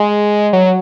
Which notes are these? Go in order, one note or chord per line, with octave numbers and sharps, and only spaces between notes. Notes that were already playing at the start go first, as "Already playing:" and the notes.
Already playing: G#3
F#3